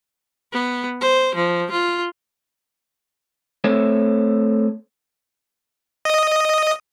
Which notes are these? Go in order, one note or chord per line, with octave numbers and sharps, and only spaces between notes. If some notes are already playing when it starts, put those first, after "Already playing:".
B3
C5
F3
F4
A3 C4 A4 C#5 E5
D#5 D#6